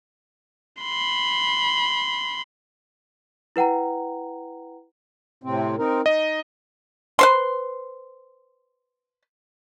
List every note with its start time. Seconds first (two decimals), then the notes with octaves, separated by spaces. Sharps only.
0.81 B5 C6
3.56 E4 B4 F#5 G5 A#5
5.43 A2 C3 C4
5.78 C4 D#4 A#4
6.06 D#4 D#5
7.19 B4 C5 C6